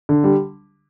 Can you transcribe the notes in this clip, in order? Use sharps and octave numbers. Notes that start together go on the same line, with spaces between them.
D3
G3